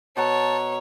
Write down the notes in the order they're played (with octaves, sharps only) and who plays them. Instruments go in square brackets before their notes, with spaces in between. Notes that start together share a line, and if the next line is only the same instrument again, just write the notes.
[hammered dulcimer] B2 F#5 A#5 [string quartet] C#5 [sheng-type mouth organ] A5